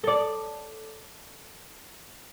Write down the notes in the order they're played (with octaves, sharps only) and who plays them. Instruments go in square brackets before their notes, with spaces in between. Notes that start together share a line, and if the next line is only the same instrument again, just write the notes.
[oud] A4 D5